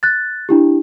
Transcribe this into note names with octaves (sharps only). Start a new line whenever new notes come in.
F#6 A6
D4 E4 G4